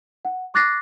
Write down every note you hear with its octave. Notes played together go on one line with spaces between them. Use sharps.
F#5
C#6 D6 F#6 A6 A#6 C7